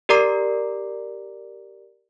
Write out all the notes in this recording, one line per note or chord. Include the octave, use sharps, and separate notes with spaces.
G4 A#4 D5 A#5 D6 C7